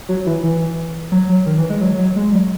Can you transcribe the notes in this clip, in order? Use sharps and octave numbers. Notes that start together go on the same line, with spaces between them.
F#3
E3
E3
F#3
F#3
D#3
E3
G#3
F#3
F#3
G#3
F#3